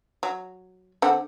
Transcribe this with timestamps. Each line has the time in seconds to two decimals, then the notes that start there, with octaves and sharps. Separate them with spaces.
0.23 F#3
1.02 D3 C4 F#5